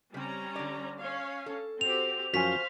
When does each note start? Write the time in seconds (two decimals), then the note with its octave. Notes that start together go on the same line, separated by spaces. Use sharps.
0.14 C#3 G3 C4 C#4 A#5
0.56 D3 D5
1.00 C#4 C#5 F5
1.46 A4
1.81 C4 F#4 G4 F7
2.34 F#2 F3 F#4 C5 F5 G#5 B6 F7